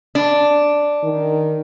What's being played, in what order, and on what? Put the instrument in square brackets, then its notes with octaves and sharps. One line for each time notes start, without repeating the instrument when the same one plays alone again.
[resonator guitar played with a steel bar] D4
[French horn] D#3